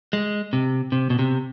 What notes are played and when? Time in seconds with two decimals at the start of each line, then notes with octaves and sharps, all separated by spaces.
0.13 G#3
0.53 C3
0.92 C3
1.10 B2
1.19 C3